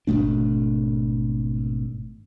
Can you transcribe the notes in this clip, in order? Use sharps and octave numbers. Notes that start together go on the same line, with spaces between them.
G#1 B2 A3 D4